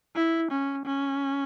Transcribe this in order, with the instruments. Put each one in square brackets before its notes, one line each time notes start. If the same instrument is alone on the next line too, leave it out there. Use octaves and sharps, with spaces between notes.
[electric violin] E4
C#4
C#4